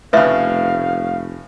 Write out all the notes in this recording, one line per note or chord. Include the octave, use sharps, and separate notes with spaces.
F1 A2 C#3 B4 E5 F5